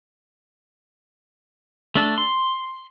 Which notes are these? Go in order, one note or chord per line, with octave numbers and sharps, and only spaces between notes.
A3 D4 A4
C6